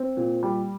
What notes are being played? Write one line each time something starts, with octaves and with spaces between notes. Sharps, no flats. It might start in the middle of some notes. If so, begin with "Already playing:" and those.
Already playing: C4
A#2
G3